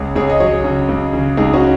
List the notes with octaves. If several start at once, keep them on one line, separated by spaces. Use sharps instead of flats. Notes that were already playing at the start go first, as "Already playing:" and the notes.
Already playing: C#2 G#4 C#5
C#2 G#4 C#5
D#5
F#3 G#4 C#5
C#3
C#2
C#3
C#2 D#4 G#4
C#4 F#4